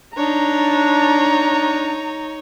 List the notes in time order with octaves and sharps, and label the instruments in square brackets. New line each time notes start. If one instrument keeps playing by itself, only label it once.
[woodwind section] D4 [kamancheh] D#4 C#5 [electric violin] A#5